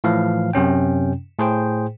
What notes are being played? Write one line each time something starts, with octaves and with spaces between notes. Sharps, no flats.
A2 E3 F3 F5
F#2 C3 C#4 G5
A2 G#4 C5 G5